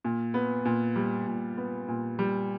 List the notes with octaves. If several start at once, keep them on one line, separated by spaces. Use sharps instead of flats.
A#2
B3
A#2
G3
A#2
B3
A#2
G3